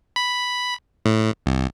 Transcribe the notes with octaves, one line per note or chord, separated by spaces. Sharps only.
B5
A2
C2